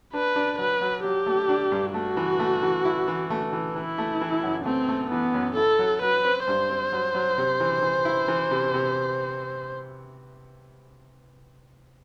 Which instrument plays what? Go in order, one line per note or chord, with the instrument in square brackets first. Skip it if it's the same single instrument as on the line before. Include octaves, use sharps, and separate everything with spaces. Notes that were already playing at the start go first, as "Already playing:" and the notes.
[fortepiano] D4 [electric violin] B4
[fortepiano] D4
[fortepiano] F#3 [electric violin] B4
[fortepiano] F#3
[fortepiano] F#3 [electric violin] G4
[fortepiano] A3
D4
G2
[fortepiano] A3 [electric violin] F#4
[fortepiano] E3
A3
E3
E4
E3
A3
E3
[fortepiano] E3 [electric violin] E4
[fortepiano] A3
E3
F#2
[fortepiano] A3 [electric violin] C4
[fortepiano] A3
[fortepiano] E3 [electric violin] B3
[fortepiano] F#2
[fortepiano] E4 [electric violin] A4
[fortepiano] F#3
[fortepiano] F#3 [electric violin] B4
[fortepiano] C4
[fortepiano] G2 [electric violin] C5
[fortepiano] C4
F#3
F#3
C3
E3
E3
E4
E3
C3
C3